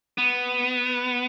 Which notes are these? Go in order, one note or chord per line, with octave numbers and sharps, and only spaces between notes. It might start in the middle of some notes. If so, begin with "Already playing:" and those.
B3